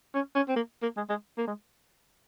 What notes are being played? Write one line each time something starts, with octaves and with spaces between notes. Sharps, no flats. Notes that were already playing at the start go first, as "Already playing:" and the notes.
C#4
C#4
C4
A#3
A#3
G#3
G#3
A#3
G#3